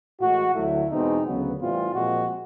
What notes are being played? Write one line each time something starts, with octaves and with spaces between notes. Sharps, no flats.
A2 E3 G#3 F#4
D2 D3 F#3 A3 E4
E2 B2 G#3 C4 D#4
D2 C#3 F#3 B3
A2 E3 G3 C4 F4
A#2 F3 G#3 C4 F#4